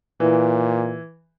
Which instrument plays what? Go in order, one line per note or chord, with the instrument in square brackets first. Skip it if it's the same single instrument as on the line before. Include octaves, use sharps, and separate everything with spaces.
[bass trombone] A#2 [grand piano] E3